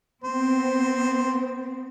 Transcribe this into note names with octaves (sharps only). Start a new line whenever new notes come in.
B3 C4 C5